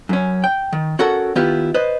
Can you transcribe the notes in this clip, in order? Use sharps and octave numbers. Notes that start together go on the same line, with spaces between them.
F#2 C#4
G5
D#3
C#4 F#4 A4 A#4 F#5
D#3 B3 E4 F4 G4 B4
B4 C5 D#5